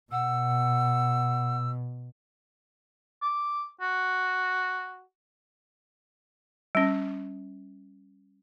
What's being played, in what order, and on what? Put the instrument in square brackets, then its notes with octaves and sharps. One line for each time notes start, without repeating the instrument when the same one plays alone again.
[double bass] B2 [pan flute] F#5 [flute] E6
[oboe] D6
F#4
[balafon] G3 C#4